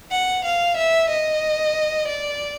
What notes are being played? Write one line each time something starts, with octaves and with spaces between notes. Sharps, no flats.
F#5
F5
E5
D#5
D5